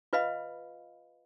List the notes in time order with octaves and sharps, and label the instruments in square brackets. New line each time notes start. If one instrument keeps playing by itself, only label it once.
[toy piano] F4 B4 D#5 F5 B5